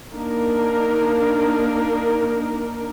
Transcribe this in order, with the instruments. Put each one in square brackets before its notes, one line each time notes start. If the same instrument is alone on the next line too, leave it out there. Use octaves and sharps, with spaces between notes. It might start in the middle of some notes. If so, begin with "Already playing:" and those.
[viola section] A#3 D4 D#4 A#4